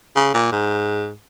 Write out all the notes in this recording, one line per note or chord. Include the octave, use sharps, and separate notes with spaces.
C#3
A#2
G#2